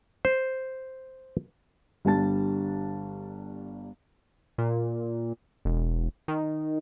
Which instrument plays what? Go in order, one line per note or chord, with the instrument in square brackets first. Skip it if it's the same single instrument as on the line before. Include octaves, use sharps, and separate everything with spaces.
[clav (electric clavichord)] C5
[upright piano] G1 G3 D4 A5 A6
[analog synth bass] A#2
E1
D#3